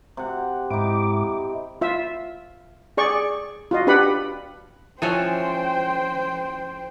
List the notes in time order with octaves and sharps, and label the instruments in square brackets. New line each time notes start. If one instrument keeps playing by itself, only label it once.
[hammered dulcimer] C3 F#5
[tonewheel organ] G#2 D6 [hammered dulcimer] D#4 E4
[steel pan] F4 E5
G#4 D5 C#6
F4 F#4 D#5
D4 G4 B4 F#5 B5
[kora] E3 F3 C#4 [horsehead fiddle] C5 G5